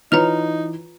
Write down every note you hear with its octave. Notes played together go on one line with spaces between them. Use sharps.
E3 D#4 F4 B4 C#5 A#5 F7